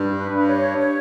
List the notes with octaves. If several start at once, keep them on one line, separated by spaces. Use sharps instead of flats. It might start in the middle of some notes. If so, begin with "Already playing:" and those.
Already playing: G2
B4
G2
C#5
C#5